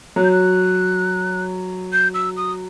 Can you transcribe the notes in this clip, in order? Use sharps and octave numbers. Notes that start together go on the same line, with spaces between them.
F#3 F#6
G6
F#6
G6
E6
D#6